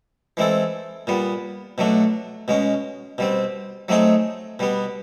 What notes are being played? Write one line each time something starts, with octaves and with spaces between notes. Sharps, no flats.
E3 G#3 C4 E4 A4
A#2 G3 B3
B2 F#3 A3 D4
B2 G#3 C#4
B2 G3 C4
F#3 A3 C4 D#4 G#4
B2 G3 B3